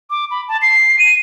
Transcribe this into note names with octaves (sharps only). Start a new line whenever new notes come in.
D6
B5
A5
C7
D#7